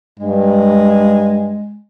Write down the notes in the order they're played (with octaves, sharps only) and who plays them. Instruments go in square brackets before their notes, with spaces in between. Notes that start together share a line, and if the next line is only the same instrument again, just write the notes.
[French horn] G2 [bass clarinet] G#3